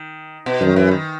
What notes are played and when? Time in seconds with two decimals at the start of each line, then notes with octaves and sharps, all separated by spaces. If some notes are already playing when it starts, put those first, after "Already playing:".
Already playing: D#3
0.46 B2
0.61 F#2 D#3
0.76 E3
0.91 D#3